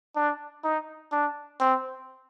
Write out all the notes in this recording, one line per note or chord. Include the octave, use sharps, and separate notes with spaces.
D4
D#4
D4
C4